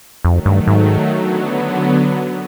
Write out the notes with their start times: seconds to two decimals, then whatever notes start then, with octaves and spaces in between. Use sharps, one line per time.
0.24 F2 D#3 F#3 A3
0.45 G2
0.67 G#2
1.10 D3 F#3 B3